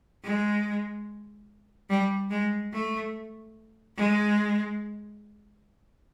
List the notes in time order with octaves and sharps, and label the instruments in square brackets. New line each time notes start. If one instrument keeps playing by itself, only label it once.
[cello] G#3
G3
G#3
A3
G#3